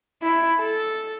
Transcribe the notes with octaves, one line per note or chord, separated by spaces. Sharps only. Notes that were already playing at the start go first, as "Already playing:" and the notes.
E4
A4